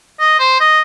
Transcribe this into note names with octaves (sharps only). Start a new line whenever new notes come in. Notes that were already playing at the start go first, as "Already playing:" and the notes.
D#5
C5
D#5